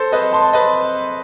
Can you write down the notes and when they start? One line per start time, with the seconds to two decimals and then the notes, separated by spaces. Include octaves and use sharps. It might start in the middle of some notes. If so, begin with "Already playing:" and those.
Already playing: A4 C5
0.12 B4 D#5
0.33 A5 C6
0.53 B4 D#5